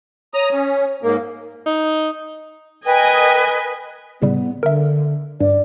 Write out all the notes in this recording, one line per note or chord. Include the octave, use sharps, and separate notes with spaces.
C#5 A#5 D#6
C#4
G#2 A#3
D#4
A#4 B4 D#5 G5 G#5
A2 C#3 G3 B3
D3 A#4 E5
G2 D5